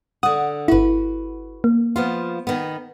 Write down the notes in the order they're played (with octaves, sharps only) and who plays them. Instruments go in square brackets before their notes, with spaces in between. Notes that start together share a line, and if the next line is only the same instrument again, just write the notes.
[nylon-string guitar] D3 F#5 [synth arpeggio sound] D#6
[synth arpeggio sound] G1 E4 [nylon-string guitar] F#4 B4
[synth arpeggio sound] A#3
[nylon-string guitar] F3 B3 F4
D#3 B3